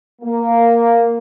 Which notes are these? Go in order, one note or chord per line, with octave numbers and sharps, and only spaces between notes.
A#3